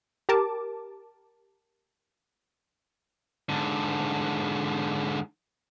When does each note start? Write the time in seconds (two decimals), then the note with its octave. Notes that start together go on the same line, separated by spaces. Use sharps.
0.29 G4 A#4 A5 D6
3.49 G#2 D3